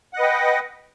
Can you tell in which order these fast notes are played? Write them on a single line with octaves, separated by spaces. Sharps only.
F#5 D#5 B4 G5